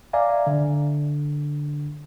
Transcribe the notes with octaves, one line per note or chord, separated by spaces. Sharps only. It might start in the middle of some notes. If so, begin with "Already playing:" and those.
D5 E5 F5 G#5 A#5
D3